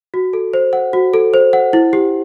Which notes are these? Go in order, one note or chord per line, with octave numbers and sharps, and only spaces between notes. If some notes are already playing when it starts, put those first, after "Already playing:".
F#4
A4
C5
F#5
F#4
A4
C5
F#5
E4
G4